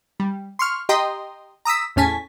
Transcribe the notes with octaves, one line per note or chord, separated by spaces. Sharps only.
G3
C6 C#6 F6
G4 D#5 G5 A#5 C6 D#6
A#5 D#6 E6 B6
E2 A2 C#4 G#5 A5 B6